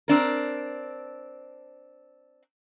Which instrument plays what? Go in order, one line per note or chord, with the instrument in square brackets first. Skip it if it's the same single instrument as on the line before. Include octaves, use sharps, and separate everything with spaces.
[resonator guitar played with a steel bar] C4 D4 A#4